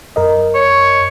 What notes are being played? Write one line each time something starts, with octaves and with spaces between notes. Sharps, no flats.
F#2 A#4 D#5
C#5